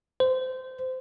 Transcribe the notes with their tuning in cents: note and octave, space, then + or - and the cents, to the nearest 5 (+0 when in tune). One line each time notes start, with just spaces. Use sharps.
C5 -20